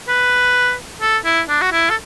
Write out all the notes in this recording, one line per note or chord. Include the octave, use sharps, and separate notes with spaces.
B4
A4
E4
D4
F#4
E4
A4